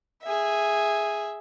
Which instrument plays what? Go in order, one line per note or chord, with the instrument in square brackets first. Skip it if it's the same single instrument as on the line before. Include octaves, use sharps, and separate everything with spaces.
[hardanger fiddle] G#4 E5